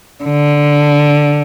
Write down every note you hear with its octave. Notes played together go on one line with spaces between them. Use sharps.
D3